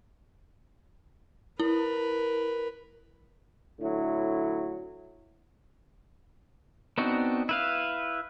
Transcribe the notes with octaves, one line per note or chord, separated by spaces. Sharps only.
E4 A#4 B4
A2 D3 F#3 E4
B3 C4 D4 D#4 F#4
E4 B4 F5